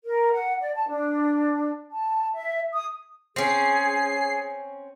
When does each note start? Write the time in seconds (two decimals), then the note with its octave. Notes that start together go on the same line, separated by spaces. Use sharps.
0.05 A#4
0.32 F#5
0.60 D5
0.75 A5
0.88 D4
1.92 A5
2.34 E5
2.74 D#6
3.36 C4 C#4 G#4 C7